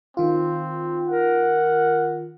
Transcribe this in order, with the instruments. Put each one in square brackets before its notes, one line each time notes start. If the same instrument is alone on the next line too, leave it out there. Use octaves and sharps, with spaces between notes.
[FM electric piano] D#3 F4 [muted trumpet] C4
[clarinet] A#4 [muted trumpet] F#5